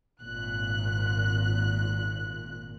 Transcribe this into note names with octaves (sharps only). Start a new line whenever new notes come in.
G#1 A#2 F#6